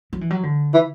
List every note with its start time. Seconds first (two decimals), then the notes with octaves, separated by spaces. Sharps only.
0.13 F#3
0.21 E3
0.30 F#3
0.43 D3
0.74 E3